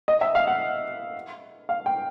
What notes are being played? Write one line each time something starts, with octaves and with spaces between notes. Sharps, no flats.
D#5
E5
F5
F#5
F5
G5